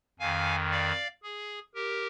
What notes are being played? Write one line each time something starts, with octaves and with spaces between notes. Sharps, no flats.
F2 D#3 F5 G#5
D5 F5
G#4
G4 A#4